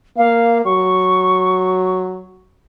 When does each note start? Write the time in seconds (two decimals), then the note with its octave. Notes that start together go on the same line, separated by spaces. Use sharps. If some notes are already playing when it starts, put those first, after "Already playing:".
0.17 A#3 F5
0.65 F#3 C#6